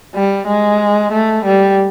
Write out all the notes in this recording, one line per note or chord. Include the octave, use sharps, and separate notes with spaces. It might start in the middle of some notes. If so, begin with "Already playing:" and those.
G3
G#3
A3
G3